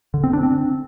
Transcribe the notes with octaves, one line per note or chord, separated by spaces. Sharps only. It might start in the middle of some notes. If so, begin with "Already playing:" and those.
D3
C4
D4
C4